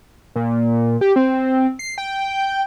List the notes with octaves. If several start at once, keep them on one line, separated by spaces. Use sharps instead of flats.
A#2
G4
C4
C7
G5